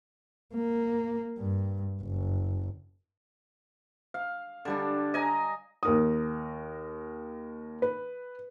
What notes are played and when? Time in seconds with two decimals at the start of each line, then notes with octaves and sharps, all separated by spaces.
0.55 A#3
1.38 G2
2.02 F#1
4.14 F5
4.65 D3 G3 D4
5.14 D#5 G#5 A#5
5.83 D#2 A#4 D#6
7.82 B4